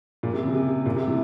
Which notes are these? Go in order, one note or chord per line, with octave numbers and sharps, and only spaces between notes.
A#2
C3
C#3
C3
A#2
C3
A2